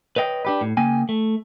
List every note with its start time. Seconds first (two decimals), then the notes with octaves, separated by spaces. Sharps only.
0.16 B4 C#5 D#5 G5
0.45 D4 G4 B4
0.61 A2
0.77 C#3 A#3 G5 G#5
1.09 A3